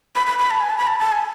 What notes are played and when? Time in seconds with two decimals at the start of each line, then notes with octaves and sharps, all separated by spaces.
0.15 B5
0.26 B5
0.39 B5
0.51 A5
0.60 G#5
0.70 A5
0.78 B5
0.87 A5
0.99 A5
1.12 G#5